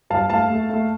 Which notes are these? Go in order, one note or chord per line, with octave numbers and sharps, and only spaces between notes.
G2 F5 A5
A3 F5 A5
A3
A3